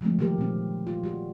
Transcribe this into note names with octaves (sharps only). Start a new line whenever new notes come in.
D3 F3 G#3 A3 C4
D#3 F#3 A#3 G4 A#4
A#2 C4
F4
G3 F#4